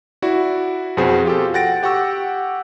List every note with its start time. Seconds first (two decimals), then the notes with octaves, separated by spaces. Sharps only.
0.22 E4 F#4 D5
0.97 F2 B2 F#4 G#4 C5
1.25 F4 G4 A4
1.54 F#5 G5 A6 A#6 D7
1.83 G4 F#5 G5 C#6 E6